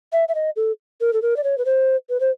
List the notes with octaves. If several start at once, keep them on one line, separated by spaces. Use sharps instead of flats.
E5
E5
D#5
A4
A#4
A4
A#4
D5
C#5
B4
C5
B4
C5